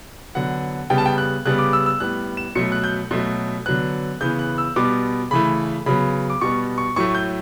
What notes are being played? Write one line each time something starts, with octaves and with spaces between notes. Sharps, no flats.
D3 F#3 B3 F#5
C#3 G3 B3 G5
A5
G5
F#6
C#3 G3 B3 F#6
D6
E6
E6
A2 G3 B3 F#6
E7
B2 F#3 A3 C#7
F#6
G6
B2 F#3 A3
D3 F#3 B3 F#6
C#3 E3 B3 G6
F#6
E6
B2 G3 B3 D6
C#3 E3 A3 B5
C#3 F#3 B3 B5
D6
B2 G3 B3 C#6
C#6
A2 F#3 A3 C#6
G6